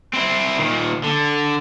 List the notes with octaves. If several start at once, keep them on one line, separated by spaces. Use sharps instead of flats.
C4 E4
A#2 D#3
D3